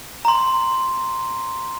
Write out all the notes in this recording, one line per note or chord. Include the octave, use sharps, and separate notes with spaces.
A#5 C6